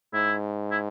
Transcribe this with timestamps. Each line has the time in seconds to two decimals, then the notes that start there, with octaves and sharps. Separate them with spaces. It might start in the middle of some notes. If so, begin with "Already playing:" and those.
0.14 G#2 E4
0.71 E4